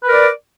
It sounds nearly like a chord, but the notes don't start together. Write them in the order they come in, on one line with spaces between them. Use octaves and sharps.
B4 A#4 D5